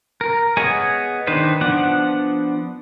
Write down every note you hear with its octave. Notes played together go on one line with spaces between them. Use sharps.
A#4
B3 G#4 C#5 D#5 G#5
D#3 D4 D#4 B4 C5
F3 B3 D4 F#5